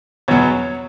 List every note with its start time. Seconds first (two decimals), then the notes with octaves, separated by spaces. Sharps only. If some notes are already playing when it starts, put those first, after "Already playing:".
0.28 E2 B2 F#3 C#5